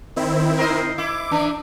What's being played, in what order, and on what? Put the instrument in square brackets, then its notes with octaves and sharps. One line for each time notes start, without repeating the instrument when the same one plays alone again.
[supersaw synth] D#3 C4 E4
[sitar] A#4 C5 D#5
[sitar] E4 [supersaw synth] D6
[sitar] E3 D4